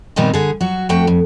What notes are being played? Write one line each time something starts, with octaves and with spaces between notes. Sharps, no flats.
A#2 D#3 G3 B3 C4 D#4
D3 G#4
F#3 F#4
F2 A3 F#4 G5
F2